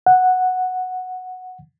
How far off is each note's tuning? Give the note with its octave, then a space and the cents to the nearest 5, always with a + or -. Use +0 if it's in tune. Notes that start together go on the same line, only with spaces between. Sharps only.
F#5 -5